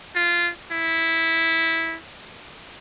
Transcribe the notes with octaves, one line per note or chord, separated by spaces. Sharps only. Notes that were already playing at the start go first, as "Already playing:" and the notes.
F4
E4